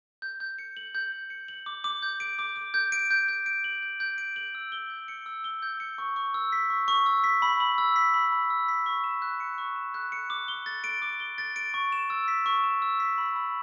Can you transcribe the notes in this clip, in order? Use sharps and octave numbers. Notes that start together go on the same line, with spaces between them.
G6
G6
C#7
F#7
G6
G6
C#7
F#7
D6
D6
G6
D7
D6
D6
G6
D7
G6
G6
D7
F#7
G6
G6
D7
F#7
E6
G7
G6
C#7
E6
G7
G6
C#7
C#6
C#6
E6
B6
C#6
C#6
E6
B6
B5
B5
E6
B6
B5
B5
E6
B6
C#6
E7
F#6
C#7
C#6
E7
F#6
C#7
D6
G7
A6
D7
D6
G7
A6
D7
C#6
E7
E6
B6
C#6
E7
E6
B6
B5
B5